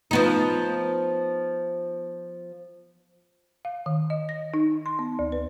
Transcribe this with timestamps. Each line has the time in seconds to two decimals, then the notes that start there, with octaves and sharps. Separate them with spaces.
0.11 F3 B3 D#4
3.65 F5
3.86 D#3
4.10 D#5
4.29 A#6
4.54 D#4
4.86 C6
4.99 B3
5.19 D2
5.32 B4